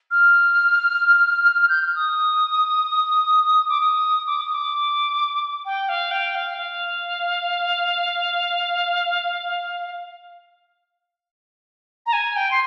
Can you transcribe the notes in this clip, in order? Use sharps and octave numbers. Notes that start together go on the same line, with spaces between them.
F6
G6
F6
D#6
D6
D#6
D6
D#6
D6
G5
F5
G5
F5
F5
A#5
G#5
G5
C6